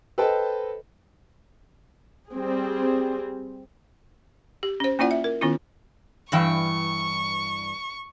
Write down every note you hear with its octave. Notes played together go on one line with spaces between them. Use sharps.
A4 B4 C5 D#5 G5 A5
G3 C4 G#4
G4
C#4 C5
A#3 C#4 E4 F4 D5 F#5
E5
A#4
D#3 B3 C#4 E4 F4
G2 E3 G5 C#6